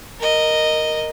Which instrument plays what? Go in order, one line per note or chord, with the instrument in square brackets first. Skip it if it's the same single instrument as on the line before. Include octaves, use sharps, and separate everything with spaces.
[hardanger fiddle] A#4 D#5